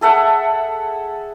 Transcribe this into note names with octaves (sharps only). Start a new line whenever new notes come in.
G#4 A4 E5 F#5